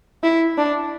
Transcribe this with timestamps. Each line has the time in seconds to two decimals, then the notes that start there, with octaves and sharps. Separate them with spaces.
0.23 E4
0.58 D4